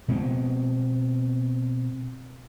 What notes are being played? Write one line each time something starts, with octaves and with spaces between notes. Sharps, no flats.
B2 G#3 B3 C4